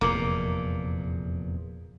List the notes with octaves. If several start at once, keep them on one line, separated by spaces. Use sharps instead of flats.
F1 E2 A#2 A#3